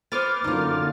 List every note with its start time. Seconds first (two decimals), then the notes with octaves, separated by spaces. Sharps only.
0.12 B3 B4 C5 D6 F6 A6
0.44 F#2 D3 A#3 D#4 F4